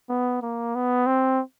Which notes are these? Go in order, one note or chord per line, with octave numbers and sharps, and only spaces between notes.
B3
A#3
B3
C4